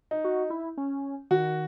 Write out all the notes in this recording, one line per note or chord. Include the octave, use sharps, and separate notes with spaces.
D#4
F#4
E4
C#4
D#3 F#4